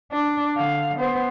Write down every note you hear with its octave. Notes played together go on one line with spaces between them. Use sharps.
D4
D3 F5
B3 C5